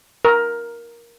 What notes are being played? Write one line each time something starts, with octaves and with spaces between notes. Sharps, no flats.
A#4